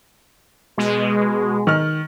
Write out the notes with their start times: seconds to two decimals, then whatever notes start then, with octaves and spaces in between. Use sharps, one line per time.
0.78 B2 G#3
1.67 D#3 F6